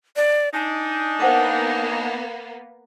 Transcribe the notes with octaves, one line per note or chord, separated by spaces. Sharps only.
D5
D4 D#4 G#5
A#3 B3 C5 F#5 D6